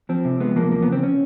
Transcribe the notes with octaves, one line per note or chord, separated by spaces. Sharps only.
F3 C4
C3
G#3 B3
F3 A#3
E2 A#3
B3
C#3
C4
C#4